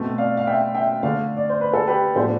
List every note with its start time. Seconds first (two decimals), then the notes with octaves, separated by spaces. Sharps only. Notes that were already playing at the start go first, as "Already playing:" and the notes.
Already playing: B2 A3 C4
0.18 D5 F5
0.37 F5
0.47 E5 G5
0.75 E5 G5
1.03 D3 A3 D4 D5 F5
1.37 D5
1.49 C5
1.61 B4
1.73 A4
1.87 G4 B4
2.15 A2 F3 B3 D4 A4 C5